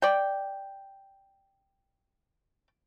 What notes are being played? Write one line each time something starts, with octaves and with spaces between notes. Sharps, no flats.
D5 G5